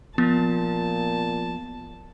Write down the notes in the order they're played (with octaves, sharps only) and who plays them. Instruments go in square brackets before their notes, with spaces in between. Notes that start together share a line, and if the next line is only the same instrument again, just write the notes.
[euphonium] A#2 [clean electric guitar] F3 [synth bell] B3 [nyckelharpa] A5